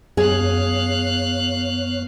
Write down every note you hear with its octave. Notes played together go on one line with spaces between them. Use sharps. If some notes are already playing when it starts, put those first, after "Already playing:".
F#2 B3 G#4 C#5 F5 F#6